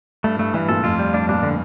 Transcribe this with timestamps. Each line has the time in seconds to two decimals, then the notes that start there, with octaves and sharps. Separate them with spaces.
0.24 G2 A3
0.34 A2
0.39 G2 A3
0.54 G2 E3
0.69 G2 A#2 A4
0.84 F2 A2 F4
0.99 G3
1.14 G2 D4
1.29 G2 A#2 D4
1.43 D3